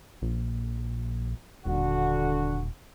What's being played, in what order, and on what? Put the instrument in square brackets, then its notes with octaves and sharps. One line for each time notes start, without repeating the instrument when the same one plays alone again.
[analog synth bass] A#1
[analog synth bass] D#1 [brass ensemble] D3 F#4